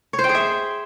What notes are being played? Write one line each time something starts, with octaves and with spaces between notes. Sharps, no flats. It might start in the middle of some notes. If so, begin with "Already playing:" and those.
C#5
C5
G5
G#4
E5